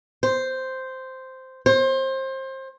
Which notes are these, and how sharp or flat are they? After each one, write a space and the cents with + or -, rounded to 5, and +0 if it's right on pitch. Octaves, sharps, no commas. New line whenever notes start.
C5 -5
C5 +25